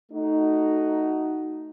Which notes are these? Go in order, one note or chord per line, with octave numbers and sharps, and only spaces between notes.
A3 D#4 F#4